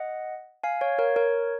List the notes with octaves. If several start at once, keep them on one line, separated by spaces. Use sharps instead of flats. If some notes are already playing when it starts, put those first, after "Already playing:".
Already playing: D#5 F#5
F5 G#5
C#5 F5
A#4 C#5
A#4 C#5